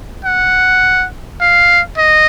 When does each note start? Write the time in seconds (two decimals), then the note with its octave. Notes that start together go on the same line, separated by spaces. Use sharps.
0.25 F#5
1.41 F5
1.98 D#5